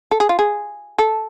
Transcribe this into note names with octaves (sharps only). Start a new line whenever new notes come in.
A4
G#4
F4
G#4
A4